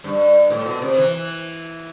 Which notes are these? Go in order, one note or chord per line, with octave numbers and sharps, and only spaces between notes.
G2
A2
B2
C3
E3